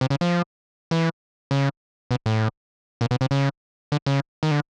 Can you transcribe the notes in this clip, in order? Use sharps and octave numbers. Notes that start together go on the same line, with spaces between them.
C3
C#3
F3
E3
C#3
B2
A2
A#2
B2
C3
C#3
D3
C#3
D#3
D3